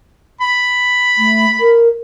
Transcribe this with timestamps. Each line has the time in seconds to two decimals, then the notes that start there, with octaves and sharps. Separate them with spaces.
0.41 B5
1.18 A3
1.60 A#4